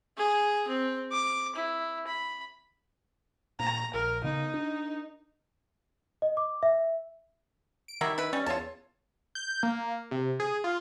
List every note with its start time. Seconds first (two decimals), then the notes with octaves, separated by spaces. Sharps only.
0.17 G#4
0.68 C4
1.12 D6
1.55 E4
2.07 B5
3.59 A#2 A#5
3.94 A#1 A#4
4.24 C#3 B3 D#4
4.54 D4
6.22 D#5
6.37 D6
6.63 E5
7.88 D7
8.01 D#3 F#3 G3 E4
8.18 E4 B4
8.33 G3 C#4
8.46 E2 F4 C#5 A5
9.35 G6
9.63 A#3
10.11 C3
10.40 G#4
10.64 F4